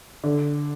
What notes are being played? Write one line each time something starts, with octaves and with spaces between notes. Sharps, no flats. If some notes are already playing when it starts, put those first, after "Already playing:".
D3